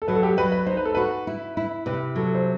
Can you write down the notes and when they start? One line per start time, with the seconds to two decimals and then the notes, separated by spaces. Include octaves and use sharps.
0.02 A4
0.08 F#3 B4
0.15 A4
0.23 G4
0.37 F#3 B4
0.52 B4
0.67 D#4 C5
0.77 B4
0.85 A4
0.95 F#4 B4
1.27 E4
1.57 E4
1.86 C3 B4
2.15 F#3 A4
2.35 C5